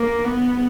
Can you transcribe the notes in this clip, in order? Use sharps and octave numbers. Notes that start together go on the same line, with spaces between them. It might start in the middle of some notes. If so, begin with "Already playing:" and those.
Already playing: A#3
B3